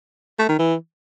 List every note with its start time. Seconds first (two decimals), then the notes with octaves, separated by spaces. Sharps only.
0.39 A3
0.49 D#3
0.59 E3